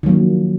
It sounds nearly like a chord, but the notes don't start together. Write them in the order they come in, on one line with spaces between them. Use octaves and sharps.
D#3 F#3 A#3 F3